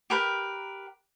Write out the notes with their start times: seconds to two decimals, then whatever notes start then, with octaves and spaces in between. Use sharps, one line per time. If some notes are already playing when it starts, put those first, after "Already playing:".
0.10 G4 A#4 B4 G5